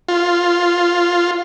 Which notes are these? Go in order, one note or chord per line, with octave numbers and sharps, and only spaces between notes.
F4